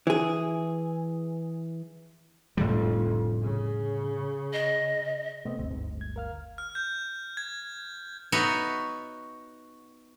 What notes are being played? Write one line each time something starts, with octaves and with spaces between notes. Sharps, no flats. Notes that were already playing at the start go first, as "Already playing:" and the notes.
E3 G#4
F1 F2 A2 D3 G3
C#3
D#5
C3 A3 B3 C4 D#5
G1 D2 C4
G#2
G#6
A#4 F5 F6
F6
G6
G#6
B3 D#4 F#4 C#5 E5